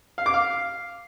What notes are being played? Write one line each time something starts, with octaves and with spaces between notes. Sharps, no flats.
F5
D6
F5